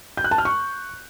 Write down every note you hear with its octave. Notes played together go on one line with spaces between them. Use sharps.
G6
F#6
A5
F6
C#6